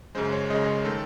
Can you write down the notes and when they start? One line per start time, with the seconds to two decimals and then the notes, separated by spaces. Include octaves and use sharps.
0.15 F#2 C#3 G#3 C5
0.32 C#5
0.50 F#2 C#3 G#3 D#5
0.68 C#5
0.85 D#3 A3 A4